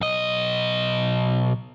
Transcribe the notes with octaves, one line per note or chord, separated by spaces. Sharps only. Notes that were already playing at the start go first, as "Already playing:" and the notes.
B1 D#5